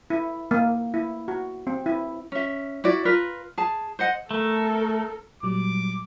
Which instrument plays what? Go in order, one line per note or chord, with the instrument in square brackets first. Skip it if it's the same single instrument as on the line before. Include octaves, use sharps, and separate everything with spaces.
[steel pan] E4
A#3
E4
F#4
C4
E4
[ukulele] C#4 E5
E4 F#4 D5
F4 A#4 B4
G#4 A5
C5 D#5 F#5
[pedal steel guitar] A3 [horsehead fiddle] A4 A#4
[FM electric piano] A#2 F#3 G3 [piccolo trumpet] D6